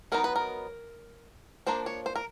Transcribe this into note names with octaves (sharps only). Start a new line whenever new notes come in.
F#3 B3 D#4 A#4
B4
A#4
F3 A#3 D4 C5
C#5
C5
A#4